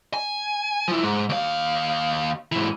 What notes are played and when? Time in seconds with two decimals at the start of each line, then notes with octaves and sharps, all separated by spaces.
0.14 G#5
0.88 F3 E4
1.03 G#2
1.29 D#2 F5
2.52 G#2 E3